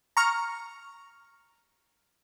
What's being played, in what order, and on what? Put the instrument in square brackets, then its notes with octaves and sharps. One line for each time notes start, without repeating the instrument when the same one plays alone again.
[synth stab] A#5 C#6 F6